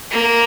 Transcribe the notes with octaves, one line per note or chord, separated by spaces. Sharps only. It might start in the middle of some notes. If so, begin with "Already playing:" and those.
A#3